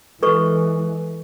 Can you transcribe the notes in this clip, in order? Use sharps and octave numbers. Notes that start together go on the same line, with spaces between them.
E3 G#3 A4 B4 C#6